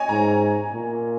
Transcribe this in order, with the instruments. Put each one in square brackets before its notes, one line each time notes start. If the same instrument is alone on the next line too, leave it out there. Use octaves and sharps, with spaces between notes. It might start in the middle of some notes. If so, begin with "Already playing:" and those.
Already playing: [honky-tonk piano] C#5 D#5 G#5
[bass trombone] G#2 [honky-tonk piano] A#5
[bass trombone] A#2